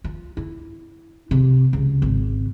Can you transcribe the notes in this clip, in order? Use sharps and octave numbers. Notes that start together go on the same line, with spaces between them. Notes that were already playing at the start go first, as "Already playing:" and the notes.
F4
E4
C3
C#2
G#1